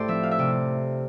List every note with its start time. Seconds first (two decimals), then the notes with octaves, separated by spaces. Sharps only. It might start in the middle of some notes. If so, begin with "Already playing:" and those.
Already playing: A2 G4 A4 C5 D5
0.08 F3 C4 E5
0.23 F5
0.31 E5
0.39 C3 D5